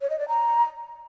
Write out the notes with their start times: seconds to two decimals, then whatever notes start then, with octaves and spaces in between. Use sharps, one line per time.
0.01 C#5
0.10 D#5
0.19 D5
0.28 A#5